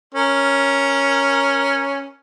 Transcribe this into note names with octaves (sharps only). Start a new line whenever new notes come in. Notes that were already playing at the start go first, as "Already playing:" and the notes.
C#4 A#4